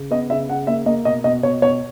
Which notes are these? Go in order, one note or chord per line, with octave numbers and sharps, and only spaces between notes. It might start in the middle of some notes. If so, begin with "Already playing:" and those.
Already playing: C#3
B3 D#5
C#3 E5
C#3 F#5
A#3 E5
A#3 D#5
B2 D#5
B2 D#5
B2 C#5
B2 C#5